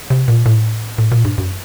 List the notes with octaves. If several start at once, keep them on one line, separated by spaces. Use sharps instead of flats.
C3
A#2
A2
A2
A#2
G2
F#2